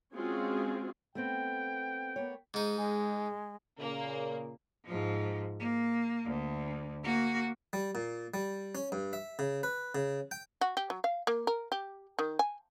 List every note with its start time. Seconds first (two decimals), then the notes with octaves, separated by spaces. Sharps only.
0.14 G#3 C4 C#4 F4 F#4 G#4
1.15 A3 B3 C4 G5
2.16 A#3 B3 C#5
2.54 G#2 D#4
2.76 G#3
3.79 A#2 C#3 A#3
4.85 G#2 F3
5.60 A#3
6.26 D2
7.03 A#3 F#4
7.73 G3
7.95 A#2
8.34 G3
8.75 C#4
8.92 G2
9.13 E5
9.39 C#3
9.63 B4
9.95 C#3
10.31 G5
10.61 F#4
10.77 G4
10.90 F#3
11.04 F5
11.27 A#3
11.47 A#4
11.72 G4
12.19 D#3
12.39 G#5